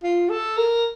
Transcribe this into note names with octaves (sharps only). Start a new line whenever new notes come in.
F4
A4
A#4